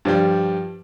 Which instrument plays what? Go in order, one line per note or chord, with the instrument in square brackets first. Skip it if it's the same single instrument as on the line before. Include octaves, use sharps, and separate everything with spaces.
[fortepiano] G2 F3 G3